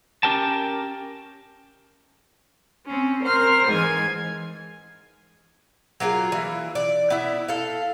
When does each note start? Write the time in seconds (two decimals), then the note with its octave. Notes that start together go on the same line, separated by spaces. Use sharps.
0.23 C#4 G4 A#4 G5 A5
2.86 C4 C#4
3.23 A#4 C5 F6
3.68 G#2 E3 G#5 G#6
6.00 F#3 A#3 F4 G#4
6.32 E3
6.75 D5
7.10 B3 E4
7.48 A4 F5